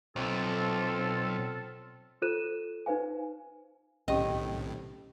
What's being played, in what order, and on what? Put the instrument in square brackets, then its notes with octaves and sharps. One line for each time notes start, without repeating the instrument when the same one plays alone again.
[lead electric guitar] B1 [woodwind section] C4 F4 A4
[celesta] F4 A4 C5 F#6 D#7 E7
D#4 B4 C5 F5 G#5
[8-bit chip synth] B1 A2 [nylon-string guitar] C3 D#3 C5 [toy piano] C#4 G4 [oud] D#5